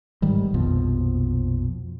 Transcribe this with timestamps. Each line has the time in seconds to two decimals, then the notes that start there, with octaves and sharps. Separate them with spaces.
0.22 G1 G#2 D#3 G3
0.54 A#1 F2 B2 F3